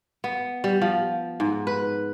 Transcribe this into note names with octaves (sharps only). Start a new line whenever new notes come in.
B3
G3
F3
G#2
B4